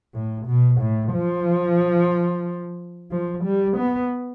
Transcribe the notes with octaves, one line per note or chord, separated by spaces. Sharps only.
A2
B2
A2
F3
F3
G3
B3